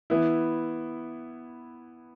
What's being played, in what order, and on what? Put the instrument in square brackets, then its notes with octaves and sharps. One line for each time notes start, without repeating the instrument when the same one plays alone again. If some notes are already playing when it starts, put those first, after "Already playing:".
[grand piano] E3 B3 E4